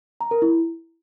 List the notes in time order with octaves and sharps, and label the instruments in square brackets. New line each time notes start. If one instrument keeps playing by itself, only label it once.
[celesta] A#5
A#4
E4